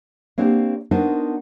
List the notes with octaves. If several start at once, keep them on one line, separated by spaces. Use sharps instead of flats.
A#3 C4 D4 F#4 G4
B3 D4 D#4 F#4 A#4 C5